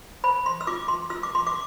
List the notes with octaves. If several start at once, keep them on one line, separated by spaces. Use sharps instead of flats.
C5 B5
C6
E6
F4 D6
C6
F4 E6
D6
C6
D6